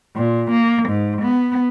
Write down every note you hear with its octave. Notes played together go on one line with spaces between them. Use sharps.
A#2
A#3
G#2
B3